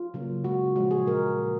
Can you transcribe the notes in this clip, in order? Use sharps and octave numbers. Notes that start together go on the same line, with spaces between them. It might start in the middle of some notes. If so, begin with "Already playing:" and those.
Already playing: F4
C#3 F#3 A#3
C#3 G#3 F#4
A#2 F3 G#3 F#4
G#4
A#2 A#4